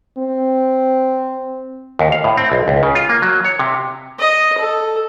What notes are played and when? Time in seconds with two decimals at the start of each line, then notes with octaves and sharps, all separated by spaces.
0.18 C4
1.99 D#2
2.12 F5
2.24 A2
2.37 C4
2.52 B1
2.68 C#2
2.83 C#3
2.95 F4
3.09 A#3
3.22 F#3
3.44 C#5
3.59 C3
4.19 D#5
4.58 A4